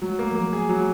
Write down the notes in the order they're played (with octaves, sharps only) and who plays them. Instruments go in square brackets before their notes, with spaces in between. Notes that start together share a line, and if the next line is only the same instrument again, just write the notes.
[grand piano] F#3 [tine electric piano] G#3
[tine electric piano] A3 [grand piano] A#3
[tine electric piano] F3
[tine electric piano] F#3 [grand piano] A#3
[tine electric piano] F3 [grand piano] G#4
[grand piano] F#3
[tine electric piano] G3